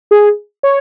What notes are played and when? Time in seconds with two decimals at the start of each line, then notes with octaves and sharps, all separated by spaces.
0.11 G#4
0.63 C#5